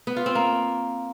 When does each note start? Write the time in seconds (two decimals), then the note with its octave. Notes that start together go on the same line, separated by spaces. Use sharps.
0.07 B3
0.16 F4
0.26 C4
0.35 A#3